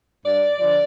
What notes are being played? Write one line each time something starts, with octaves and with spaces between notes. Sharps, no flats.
G2 D5
D3 F3